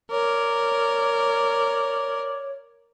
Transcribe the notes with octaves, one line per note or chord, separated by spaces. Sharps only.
A#4 C#5 D5